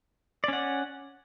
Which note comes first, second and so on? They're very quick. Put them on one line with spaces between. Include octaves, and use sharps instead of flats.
D5 C#4 F#5